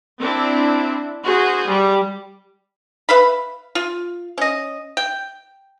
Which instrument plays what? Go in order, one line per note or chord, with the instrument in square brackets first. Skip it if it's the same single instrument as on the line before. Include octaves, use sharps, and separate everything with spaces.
[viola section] C4 D4 E4
F#4 G#4 C5
G3
[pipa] B4 E5 F5 B5
F4
C#4 D#5
G5